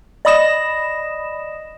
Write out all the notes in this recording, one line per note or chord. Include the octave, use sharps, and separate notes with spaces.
D5 D#5 B5 D#6 A#6 E7